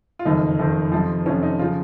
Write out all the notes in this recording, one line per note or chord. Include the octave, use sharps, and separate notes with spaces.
F4
F#1 F2 D#3 D#4
F#1 F2 D#3
F2 C3 F3
F2 C3 F3 C#4
D#4
C#3 F3 F4